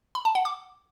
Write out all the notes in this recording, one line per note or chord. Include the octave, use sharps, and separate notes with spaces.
B5
A5
F#5
D6